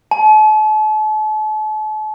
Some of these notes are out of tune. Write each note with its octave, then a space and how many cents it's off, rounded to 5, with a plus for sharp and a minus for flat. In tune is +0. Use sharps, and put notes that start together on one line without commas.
A5 -40